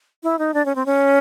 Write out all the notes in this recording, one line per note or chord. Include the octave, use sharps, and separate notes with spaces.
E4
D#4
D4
C#4
C4
C#4